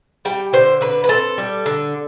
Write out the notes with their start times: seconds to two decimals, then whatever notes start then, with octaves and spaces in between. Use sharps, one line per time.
0.25 G3 G5
0.53 D3 C5
0.81 D3 B4
1.04 B4
1.09 C4 A4
1.38 G3
1.66 D3